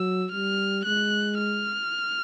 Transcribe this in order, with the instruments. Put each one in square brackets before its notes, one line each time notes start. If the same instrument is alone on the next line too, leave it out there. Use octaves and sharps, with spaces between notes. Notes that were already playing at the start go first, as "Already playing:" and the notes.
Already playing: [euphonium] F#3 [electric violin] E6
[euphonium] G3 [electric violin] F6
[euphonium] G#3 [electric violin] F#6
[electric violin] F6